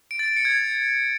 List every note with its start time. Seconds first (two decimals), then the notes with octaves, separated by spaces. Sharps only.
0.11 D7
0.19 A6
0.28 D7
0.37 C#7
0.45 G#6